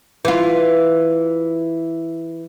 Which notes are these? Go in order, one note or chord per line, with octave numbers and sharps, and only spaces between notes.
E3 F4